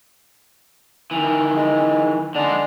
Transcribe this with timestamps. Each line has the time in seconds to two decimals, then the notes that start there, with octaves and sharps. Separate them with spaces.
1.11 D#3 E3
1.57 G#3
2.35 D3 G#3 D4